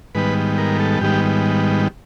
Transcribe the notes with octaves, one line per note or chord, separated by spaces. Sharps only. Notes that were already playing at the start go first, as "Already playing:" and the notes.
G#2 D#3 G3 B3 B4
A#4
A4
G#2 D#3 G3 B3 G4